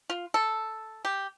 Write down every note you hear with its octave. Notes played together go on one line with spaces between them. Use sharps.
F4
A4
G4